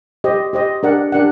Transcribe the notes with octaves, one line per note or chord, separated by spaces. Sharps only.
G4 C5 D#5
G4 C5 D#5
D4 G4 A#4 D5 F#5
D4 G4 A#4 D5 F#5